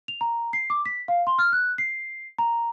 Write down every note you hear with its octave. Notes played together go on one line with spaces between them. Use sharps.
F7
A#5
C7
D6
B6
F5
C6
F6
F#6
C7
A#5